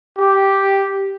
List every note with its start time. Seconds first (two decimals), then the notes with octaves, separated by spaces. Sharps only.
0.17 G4